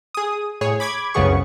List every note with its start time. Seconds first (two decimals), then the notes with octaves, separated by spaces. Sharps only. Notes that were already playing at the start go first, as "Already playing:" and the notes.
0.14 G#4 D#6
0.61 A2 G#4 C#5
0.80 B5 D6 G#6
1.14 C2 F#2 C#3 B3 G#4 C#6